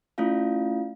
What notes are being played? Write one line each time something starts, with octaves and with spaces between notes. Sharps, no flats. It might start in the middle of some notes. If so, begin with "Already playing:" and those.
A3 C#4 E4 F4 F5